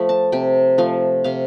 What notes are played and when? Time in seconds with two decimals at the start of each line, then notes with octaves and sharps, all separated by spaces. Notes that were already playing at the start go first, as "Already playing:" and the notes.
Already playing: F3 A3 B5
0.09 A5
0.32 C3 G5
0.78 F3 A3 F5
1.24 C3 F5